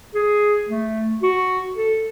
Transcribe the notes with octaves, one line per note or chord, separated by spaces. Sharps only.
G#4
A3
F#4
A4